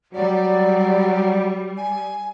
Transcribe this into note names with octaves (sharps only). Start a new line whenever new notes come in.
F#3 G3 D5
G#5